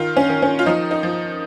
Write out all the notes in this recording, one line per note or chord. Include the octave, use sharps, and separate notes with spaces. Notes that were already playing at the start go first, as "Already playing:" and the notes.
Already playing: D#3 F4
C#4
D#3
C#4
F4
F3 D#4
D#4
F3